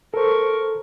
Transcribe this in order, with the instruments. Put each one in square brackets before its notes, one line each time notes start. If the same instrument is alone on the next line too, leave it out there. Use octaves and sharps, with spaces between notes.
[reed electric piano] A4 C5 [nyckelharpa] A#4 C#6